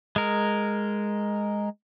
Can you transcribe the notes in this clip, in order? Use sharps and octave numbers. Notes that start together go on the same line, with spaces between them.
G#3 A#4